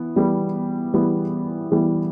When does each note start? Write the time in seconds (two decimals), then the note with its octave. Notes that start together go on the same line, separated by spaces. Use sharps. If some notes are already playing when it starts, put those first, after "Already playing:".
Already playing: E3 B3
0.16 E3 G3 B3
0.94 E3 G3 B3
1.72 E3 G3 B3